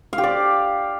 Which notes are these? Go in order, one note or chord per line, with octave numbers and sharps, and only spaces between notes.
F5
G4
D5